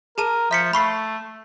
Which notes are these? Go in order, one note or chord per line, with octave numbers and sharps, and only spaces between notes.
G#4 A#4 A5 D#7
F3 E5 B6 C#7
A3 B5 C#6 C7